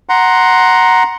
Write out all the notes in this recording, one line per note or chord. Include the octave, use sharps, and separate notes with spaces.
F#5 A#5 C6